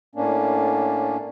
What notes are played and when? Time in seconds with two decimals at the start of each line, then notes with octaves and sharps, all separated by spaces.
0.15 A2 A#3 C#4 D4